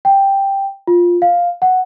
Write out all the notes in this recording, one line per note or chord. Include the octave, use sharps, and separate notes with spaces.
G5
F4
F5
F#5